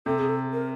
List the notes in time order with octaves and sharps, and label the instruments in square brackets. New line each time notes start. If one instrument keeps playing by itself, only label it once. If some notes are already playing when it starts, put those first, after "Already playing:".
[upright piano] C3 [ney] A4
[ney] G#4
A4
A#4